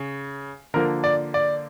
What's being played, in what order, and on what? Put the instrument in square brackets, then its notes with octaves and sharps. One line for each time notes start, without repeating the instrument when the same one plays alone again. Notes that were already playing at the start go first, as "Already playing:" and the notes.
Already playing: [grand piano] C#3
D3 F3 A#3 A#4
D5
D5